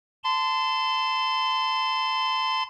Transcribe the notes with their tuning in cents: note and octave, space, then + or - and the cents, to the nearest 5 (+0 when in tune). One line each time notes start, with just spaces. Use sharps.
A5 +0 C6 -25